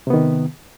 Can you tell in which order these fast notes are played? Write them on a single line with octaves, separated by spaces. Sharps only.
C3 B3 D#3